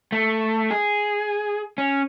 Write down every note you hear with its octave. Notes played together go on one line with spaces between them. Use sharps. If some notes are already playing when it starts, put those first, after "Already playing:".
A3
G#4
C#4